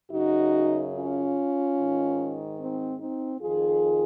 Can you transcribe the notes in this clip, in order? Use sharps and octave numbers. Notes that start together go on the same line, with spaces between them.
F#2 C#3 D#4 F#4
C#4 F4
G#2 D#3
C4 D#4
C4 D#4
F2 D#3 F4 G#4